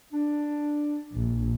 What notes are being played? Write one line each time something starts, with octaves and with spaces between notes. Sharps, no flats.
D4
A#1